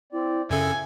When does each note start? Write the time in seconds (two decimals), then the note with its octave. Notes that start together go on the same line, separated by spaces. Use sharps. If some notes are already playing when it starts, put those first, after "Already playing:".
0.12 C4 E4 D5
0.50 F#2 C#3 C#4 A4 E5 G#5